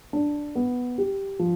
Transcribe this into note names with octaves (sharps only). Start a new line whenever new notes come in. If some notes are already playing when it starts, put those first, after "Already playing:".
D4
B3
G4
F3